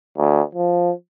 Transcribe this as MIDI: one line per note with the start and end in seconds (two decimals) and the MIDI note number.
0.17 0.42 38
0.55 0.92 53